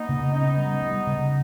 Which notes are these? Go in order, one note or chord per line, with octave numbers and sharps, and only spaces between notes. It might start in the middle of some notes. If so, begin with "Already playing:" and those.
Already playing: A#3 B3 D#4
C#3
B3 C#4 D#4
G3
G3
C#3